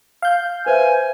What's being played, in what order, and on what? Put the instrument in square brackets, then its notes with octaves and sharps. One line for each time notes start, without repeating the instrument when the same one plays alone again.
[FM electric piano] F5 G6
[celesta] B4 C5 E5 [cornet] G#5